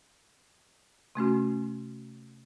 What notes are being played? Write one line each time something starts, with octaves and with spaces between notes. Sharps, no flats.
C3 A3 C#4 F#4